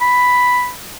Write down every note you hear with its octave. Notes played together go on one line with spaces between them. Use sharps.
B5